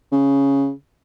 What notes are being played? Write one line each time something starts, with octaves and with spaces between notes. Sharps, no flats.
C#3